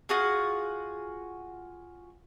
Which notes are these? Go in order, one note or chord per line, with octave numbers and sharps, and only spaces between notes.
F4 F#4 G#4